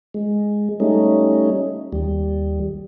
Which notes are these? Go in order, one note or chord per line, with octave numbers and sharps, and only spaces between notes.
G#3
G3 A3 C#4 D#4
D#2 G3